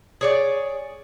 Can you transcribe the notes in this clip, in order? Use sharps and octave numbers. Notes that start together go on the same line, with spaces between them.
G#4 C#5 D5